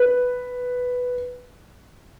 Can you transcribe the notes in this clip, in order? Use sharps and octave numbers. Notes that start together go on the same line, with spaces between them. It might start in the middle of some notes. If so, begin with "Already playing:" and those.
Already playing: B4